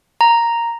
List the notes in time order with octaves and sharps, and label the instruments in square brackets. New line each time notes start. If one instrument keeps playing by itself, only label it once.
[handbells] A#5